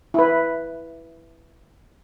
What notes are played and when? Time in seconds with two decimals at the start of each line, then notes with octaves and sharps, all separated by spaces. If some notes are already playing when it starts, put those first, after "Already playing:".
0.14 E4 B4